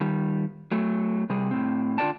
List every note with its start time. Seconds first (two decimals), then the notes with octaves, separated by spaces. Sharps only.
0.01 D#3 G3
0.71 F#3 A3
1.30 C3 G3 G#4
1.51 A2 C4
1.98 D3 F4 B4 D5 G5 A5